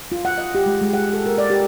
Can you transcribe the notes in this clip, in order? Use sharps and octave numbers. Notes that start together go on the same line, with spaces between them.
F4
F#5
D#5
G4
G#3
G#3
F#5
A4
A#4
D5
G4